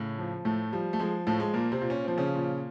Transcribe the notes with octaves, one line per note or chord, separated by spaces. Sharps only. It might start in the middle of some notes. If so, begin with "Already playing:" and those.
Already playing: A2 C#3 C#4
F3
A2 A3
F3 G3
A3
F3 G#3
A2 F3 A3
G#3
A#2 A#3
C3 C4
A#2
C#4
F3 C4
C#3 C#4
A#2